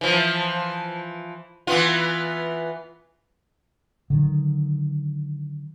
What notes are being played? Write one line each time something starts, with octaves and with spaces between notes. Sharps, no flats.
E3 F3
E3 B3 F4
D3 D#3 F#3